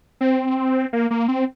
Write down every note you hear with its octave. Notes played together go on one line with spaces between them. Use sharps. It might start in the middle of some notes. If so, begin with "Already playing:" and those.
C4
A#3
A#3
C4